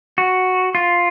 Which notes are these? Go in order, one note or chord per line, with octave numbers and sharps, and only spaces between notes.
F#4
F4